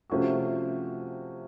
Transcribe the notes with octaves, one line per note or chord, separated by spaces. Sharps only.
C3 F3 A3 C#4 F#4